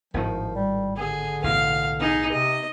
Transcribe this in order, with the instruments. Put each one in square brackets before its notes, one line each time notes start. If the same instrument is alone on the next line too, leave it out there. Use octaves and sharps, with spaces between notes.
[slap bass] G#1 A2 D#3 [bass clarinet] F3
[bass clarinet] G3
[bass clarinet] D3 [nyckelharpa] G#4
[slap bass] B1 A2 E3 [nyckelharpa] F5
[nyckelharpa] D#4 G#4
[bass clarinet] C3 [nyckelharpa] D#5